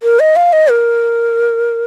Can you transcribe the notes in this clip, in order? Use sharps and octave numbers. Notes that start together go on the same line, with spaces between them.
A#4
D#5
F5
D#5
A#4